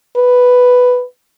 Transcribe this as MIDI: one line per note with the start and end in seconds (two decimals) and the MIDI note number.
0.16 1.04 71